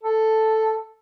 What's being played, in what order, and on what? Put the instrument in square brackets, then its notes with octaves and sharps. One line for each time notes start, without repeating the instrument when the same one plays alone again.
[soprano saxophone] A4